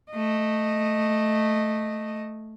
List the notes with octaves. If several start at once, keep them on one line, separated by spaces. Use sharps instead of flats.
A3 D#5